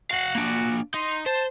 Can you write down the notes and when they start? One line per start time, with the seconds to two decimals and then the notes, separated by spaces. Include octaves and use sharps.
0.11 F#4 F5 F#5
0.35 A#3 D4
0.94 D#4 C6
1.26 C5 A5